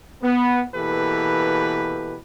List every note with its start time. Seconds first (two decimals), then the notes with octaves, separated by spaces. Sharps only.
0.23 B3
0.75 B2 E3 A#3 G4 A4 B4